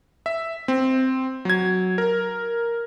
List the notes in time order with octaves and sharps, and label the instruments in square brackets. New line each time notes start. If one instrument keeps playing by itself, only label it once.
[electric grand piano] E5
C4
F#3 G#6
A#4